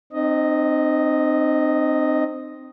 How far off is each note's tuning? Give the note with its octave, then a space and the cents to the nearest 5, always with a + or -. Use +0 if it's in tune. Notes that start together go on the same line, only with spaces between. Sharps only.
C4 +0 D#4 -40 D#5 +0